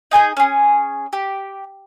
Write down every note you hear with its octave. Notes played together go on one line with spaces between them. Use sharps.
D#4 G#4 G#5 G6
C#4 G#4
G4